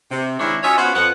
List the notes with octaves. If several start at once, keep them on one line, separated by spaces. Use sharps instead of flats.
C3
D#3 G#3 C4 D4 E4 C#5
C#4 F4 F#4 C#5 D#5 E5
B3 C#4 F4 F#4 B4 C5
F2 B3 F#5